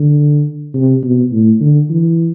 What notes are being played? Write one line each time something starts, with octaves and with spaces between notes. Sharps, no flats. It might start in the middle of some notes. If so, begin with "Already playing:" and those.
Already playing: D3
C3
B2
A2
D3
E3